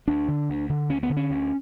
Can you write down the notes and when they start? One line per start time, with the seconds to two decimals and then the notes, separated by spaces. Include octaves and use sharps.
0.08 D2 D4
0.28 D3
0.50 D2
0.69 D3
0.89 D2 C#4
1.03 B3
1.10 D3
1.17 C#4
1.30 D2